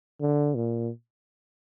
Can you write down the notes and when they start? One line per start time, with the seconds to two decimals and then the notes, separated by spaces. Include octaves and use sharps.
0.21 D3
0.55 A#2